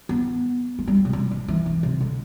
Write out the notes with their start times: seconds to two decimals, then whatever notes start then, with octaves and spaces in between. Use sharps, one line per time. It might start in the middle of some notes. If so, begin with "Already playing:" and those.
0.09 B3
0.79 A3
0.88 G3
1.05 C3
1.13 G3
1.31 F3
1.48 E3
1.66 E3
1.83 C3
2.01 D3